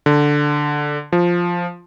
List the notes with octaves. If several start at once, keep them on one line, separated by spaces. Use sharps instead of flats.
D3
F3